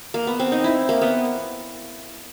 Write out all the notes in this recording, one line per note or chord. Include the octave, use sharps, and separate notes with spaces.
A#3
B3
C4
D#4
E4
A#3
B3